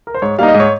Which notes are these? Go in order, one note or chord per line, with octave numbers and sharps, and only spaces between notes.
A#4
C5
G#2 C#5
G3 A#3 D#4 F5
D#5
G#2
C#5